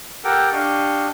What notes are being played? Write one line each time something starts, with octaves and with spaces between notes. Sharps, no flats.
G4 A4 A#4 F#5 G5
D4 G4 D#5 F5 C#6